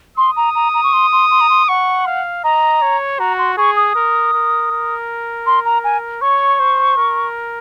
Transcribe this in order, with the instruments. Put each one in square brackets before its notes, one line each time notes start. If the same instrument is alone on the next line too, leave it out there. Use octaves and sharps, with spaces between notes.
[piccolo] C6 [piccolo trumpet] D#6
[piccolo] A#5
A#5
A#5
C#6
C6
C6
C6
A#5
C6
[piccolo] F#5 [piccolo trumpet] C#6
[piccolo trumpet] F5
[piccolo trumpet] D#5 [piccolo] A#5
[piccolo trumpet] C#5
[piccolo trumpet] F#4 [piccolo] A#5
[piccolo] C6
[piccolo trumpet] G#4 [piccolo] C#6
[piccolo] D#6
[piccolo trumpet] A#4
A#4
A#4
[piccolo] C6
A#5
G#5
[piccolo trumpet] C#5 [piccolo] C#6
[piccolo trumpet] C5
A#4